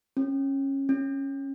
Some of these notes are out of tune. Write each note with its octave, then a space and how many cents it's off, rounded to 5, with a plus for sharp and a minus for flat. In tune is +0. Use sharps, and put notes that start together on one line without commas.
C#4 -20
C#4 -10